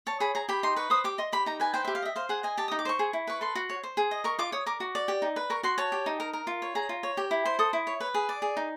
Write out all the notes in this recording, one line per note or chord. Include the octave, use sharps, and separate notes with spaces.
C#5 A5
G#4 B5
G#4 A#5
G4 B5
D#4 C6
B4 C#6
C5 D#6
G4 D6
D#5 C6
G4 B5
D#4 A#5
B4 G#5
C5 G5
E5
G4
F5
D#5 E5
C5 F5
G#4 F#5
D#5 G#5
G4 A5
D#6
D#4
D6
C5 C#6
G#4
E4
B4 C#6
A4 C6
F#4
C#5
C5
G#4
D#5
A#4 C#6
F4 D6
C#5 D#6
A#4 D6
F#4
D5
G4
D#4
B4
A#4 C#6
F#4 C6
C#5 A5
G4
D#4
A#4
A#4
F4
C#5
G#4 A#5
F4
C#5
G4
E4
C5
A4 D#6
E4
C#5
B4
G#4
D5
G#4
D#4